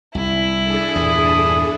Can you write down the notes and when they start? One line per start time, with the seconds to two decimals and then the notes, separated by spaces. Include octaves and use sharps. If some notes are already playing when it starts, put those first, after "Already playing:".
0.15 C2 E4
0.62 D4 G#4 A4
0.96 E2 G2 A#2 D#6